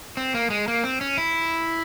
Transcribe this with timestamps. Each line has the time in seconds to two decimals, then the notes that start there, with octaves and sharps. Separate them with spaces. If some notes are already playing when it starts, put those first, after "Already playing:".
0.17 C4
0.34 A#3
0.50 G#3
0.68 A#3
0.84 C4
1.01 C#4
1.17 E4